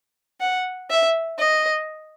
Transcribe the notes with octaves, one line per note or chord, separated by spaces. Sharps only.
F#5
E5
D#5